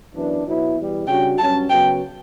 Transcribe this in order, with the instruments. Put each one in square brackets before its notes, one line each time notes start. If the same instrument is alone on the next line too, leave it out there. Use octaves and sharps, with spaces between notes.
[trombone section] F#2 E3 B3 D4
B2 F#3 B3 E4
E2 B2 G3
[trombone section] C#3 G3 D4 F#4 [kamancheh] G5
[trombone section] G2 F#3 C#4 [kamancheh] A5
[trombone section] F#2 C#3 F#3 B3 F#4 [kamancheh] G5